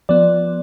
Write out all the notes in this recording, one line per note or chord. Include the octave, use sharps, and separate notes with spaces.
F3 B3 D5